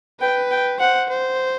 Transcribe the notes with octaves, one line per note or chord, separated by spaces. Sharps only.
B4 G5
G5
C5 F#5
C5